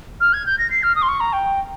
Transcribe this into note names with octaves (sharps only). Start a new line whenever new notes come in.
F6
G#6
G6
A#6
C7
F6
D#6
C6
C#6
A#5
G5